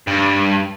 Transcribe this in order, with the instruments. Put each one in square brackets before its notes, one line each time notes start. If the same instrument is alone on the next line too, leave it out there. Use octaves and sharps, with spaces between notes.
[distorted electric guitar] G2